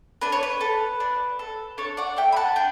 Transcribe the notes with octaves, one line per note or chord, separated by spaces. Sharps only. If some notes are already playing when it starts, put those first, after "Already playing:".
D4 B4
C#5
B4
A4
D4
A4
D4 A4 C#5
D5 F#5
A4 E5 G5
B5
F#5 A5
D4 G5